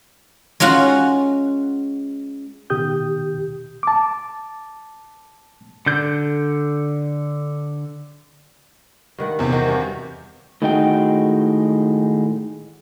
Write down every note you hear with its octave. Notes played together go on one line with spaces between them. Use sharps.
G#3 C#4 F4 F#4
B2 D#3 G4 D#6 G6
A5 D6
D3 A4 G6
G2 D#3 F#5
E2 C3
D#3 F#4
G2
A2 D#3 G#3 D#4 F#4 G5